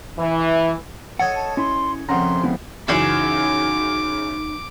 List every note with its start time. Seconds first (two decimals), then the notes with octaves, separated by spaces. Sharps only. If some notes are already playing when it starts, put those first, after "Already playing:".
0.18 E3
1.19 A4 C#5 D#5 F#5
1.35 A5
1.57 C#4 E4 C6
2.09 C2 F2 C#3 F#5 A#5 C6
2.43 G#3 B3 E4
2.88 F#2 C#3 E3 D#4 F#4 G#4 E5 D6